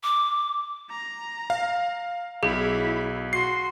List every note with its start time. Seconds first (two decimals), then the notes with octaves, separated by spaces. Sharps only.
0.04 D6
0.90 A#5
1.50 F5
2.43 B1 E4 G#4 B5
3.33 F#4 C6 C7